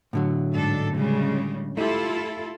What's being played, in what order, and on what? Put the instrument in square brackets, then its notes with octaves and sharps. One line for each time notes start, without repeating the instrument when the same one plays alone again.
[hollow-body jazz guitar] A2 D3 F#3
[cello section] G#2 D4 A4
C#3 G3 G#3
[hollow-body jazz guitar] A3 G4 [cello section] E4 F4 A4